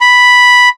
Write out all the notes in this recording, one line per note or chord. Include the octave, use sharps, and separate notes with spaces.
B5